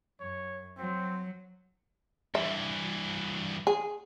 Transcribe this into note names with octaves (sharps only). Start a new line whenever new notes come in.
F#2 C#5
F#3 C4
G2 E3 E5
G#4